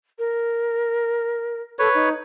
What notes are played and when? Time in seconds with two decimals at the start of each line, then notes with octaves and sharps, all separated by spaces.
0.19 A#4
1.79 A4 B4 C#5
1.94 D#4